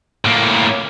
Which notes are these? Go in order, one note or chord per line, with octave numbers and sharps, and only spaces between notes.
A2 A#3